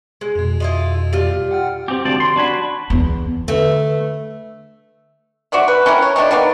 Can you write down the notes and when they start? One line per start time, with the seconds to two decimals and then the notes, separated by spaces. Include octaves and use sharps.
0.21 G#3
0.35 F2 B2
0.60 E4 F4 D#5
1.13 G3 F4
1.51 F#5 G5 F6
1.88 C4 G4
2.05 D2 F3 G4 D5
2.20 C6
2.36 D4 F#4 G#5 B5
2.90 E2
3.48 D3 A3 A4 B4
5.52 F#4 C5 D5 E5
5.68 B4
5.86 C#4 E4 G4 A#4
6.02 C#5
6.16 D#3 F3 A3 D4
6.31 D#3 A#3 B3 D4